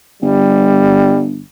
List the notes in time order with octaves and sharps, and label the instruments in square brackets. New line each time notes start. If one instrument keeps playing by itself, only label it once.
[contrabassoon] G1 [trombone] G3